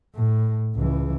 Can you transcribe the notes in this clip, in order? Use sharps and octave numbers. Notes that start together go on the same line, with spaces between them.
A2
C#2 E3